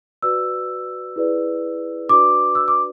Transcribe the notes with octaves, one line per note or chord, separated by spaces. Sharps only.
F#4 B4 D5 E6
E4 G#4 B4 D5
D4 F#4 B4 D5 D6
E6
D6